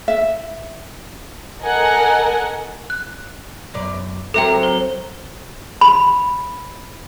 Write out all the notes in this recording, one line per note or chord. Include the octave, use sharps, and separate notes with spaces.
E5
A4 A#4 D#5 F#5 G#5
F#6
F#2 B2 D5
F#3 C4 A4 A#4 E5 G5
C5
B5